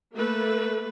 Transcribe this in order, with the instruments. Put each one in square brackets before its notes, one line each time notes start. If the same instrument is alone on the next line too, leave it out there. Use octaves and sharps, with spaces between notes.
[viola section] A3 A#3 A4 B4